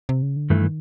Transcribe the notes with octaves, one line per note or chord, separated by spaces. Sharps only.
C3
C#3
D3
G2 D#3 E3 A3